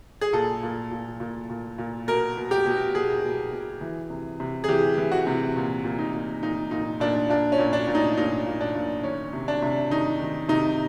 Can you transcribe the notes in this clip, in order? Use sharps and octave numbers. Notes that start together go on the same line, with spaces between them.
G#4
A#2 A4
A#2
A#2
A#2
A#2
A#2
B2 A#4
B2
G4
B2
B2 G#4
B2
B2
E3
C3
C3
G#4
E3 G4
E3
F#4
C3
A#2
A#2
D#4
A#2
A#2 D#4
A#2 D#4
A#2 D4
A#2 D4
C#4
A#2
D4
A#2
D#4
A#2 D#4
A#2
D4
A#2
D#3 C#4
C3
D4
C3
D#3 D#4
D#3
C3 D#4